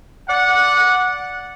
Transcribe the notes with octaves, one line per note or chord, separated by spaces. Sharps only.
D5 F#5